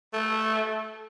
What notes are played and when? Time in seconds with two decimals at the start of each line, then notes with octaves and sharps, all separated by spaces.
0.13 A3